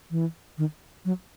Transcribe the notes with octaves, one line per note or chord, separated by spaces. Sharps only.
E3
D#3
F#3